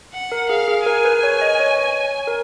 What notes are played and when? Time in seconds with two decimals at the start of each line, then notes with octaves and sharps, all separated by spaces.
0.13 F#5
0.32 A#4
0.50 G#4 F5
0.68 G#4
0.86 A#4 G#5
1.05 B4
1.23 C#5
1.42 D#5
1.60 C#5
2.27 A#4